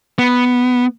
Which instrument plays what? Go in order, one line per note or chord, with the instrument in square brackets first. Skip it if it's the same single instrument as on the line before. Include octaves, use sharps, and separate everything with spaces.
[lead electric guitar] B3